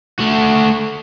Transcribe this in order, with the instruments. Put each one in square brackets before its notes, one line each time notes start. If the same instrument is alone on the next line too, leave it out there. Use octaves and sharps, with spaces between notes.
[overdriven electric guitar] A3 F#4